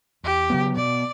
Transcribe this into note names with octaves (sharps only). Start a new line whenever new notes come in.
E2 G4
C#3 F#3 B3
B2 D5